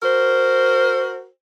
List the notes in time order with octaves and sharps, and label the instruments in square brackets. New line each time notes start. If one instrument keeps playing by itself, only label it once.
[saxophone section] F#4 A#4 C5